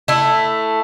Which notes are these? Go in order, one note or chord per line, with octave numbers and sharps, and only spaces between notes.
A3 E4